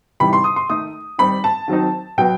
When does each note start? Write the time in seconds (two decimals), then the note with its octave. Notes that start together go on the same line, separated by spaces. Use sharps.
0.20 C3 E3 G3 D#4 B5
0.33 C6
0.44 D#6
0.56 C6
0.70 D#3 A3 D#4 D#6
1.18 D#3 G3 C4 D#4 B5
1.44 A5
1.68 D#3 F#3 C4 D#4
2.18 B2 F#3 B3 G5